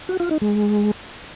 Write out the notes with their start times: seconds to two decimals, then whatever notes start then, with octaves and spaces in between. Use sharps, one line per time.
0.09 F#4
0.20 F4
0.31 D#4
0.42 G#3